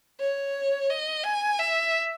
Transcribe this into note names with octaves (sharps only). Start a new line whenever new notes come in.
C#5
D#5
G#5
E5